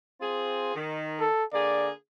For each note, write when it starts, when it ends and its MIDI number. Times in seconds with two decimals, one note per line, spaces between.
0.21 0.73 60
0.21 0.73 65
0.21 0.73 68
0.75 1.24 51
1.20 1.44 69
1.53 1.90 50
1.53 1.90 58
1.53 1.90 68
1.53 1.90 74